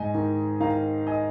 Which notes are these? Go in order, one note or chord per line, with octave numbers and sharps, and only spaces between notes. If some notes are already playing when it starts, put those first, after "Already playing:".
Already playing: G#2 D#5 G#5
D#3
D#3 F5 A#5
D#5 G#5